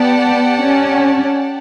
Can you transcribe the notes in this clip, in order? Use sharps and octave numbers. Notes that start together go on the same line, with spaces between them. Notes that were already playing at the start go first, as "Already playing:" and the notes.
Already playing: B3 G4 D5 F#5 A5
C#4